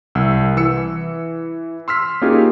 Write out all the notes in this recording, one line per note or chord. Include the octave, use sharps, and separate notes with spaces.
C2 E6
E3 E6 C#7
C6 E6 F6 B6
A#3 C#4 D#4 F4 G4 G#4